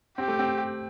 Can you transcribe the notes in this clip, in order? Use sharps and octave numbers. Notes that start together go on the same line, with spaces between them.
C4 G4
A3
C4